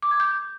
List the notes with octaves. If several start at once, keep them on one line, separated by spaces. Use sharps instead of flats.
D6
G#6
G6